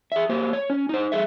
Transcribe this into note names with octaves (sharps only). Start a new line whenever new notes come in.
G#4 E5
A#3 G4 C5
C#5
C#4
D#4 C5
G#4 A4 E5